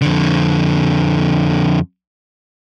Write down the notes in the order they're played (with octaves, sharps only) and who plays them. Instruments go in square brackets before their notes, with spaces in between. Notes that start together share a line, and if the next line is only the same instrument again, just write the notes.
[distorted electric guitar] F2 D3